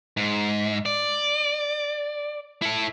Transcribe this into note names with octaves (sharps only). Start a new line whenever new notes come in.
G#2
D5
E4 A4